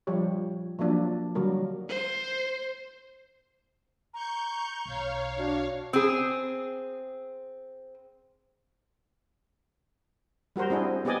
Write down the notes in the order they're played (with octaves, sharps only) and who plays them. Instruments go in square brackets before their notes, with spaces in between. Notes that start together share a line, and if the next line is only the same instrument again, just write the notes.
[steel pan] F3 G3 G4 C#5
F3 F#3 A#3 D4
D3 F#3 G3 A#4
[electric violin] C5
[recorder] A#5 [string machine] C#6 G6
[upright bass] B1 [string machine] C#5 F5
[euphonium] D4 [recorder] F#4
[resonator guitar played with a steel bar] C4 G#4
[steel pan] G3 F#4 A#4 C5
C4 D4 E4 G#4
B3 G4 G#4 D5 D#5 G#5